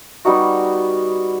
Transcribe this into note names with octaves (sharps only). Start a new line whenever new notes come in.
G3 B3 D#4 F#4